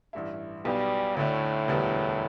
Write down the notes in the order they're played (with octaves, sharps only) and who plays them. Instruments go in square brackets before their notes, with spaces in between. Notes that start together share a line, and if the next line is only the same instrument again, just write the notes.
[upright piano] A1 G2 G3 E4
[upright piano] B1 B2 B3 G4 [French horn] G3
[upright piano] D2 D3 A3 [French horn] A2
[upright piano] E1 D2 D3 G3 B3